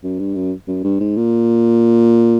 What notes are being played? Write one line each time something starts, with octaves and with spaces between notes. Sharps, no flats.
F#2
G2
F#2
F#2
G2
G#2
A#2